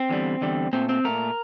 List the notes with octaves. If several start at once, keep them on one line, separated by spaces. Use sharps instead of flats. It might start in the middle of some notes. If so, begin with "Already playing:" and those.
Already playing: C4
E2 D3 G3
E2 D3 G3
A#2 A3 C4
C4
A#2 A3 A#4